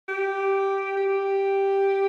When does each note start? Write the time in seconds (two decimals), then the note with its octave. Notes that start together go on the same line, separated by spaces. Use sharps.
0.08 G4
0.97 G4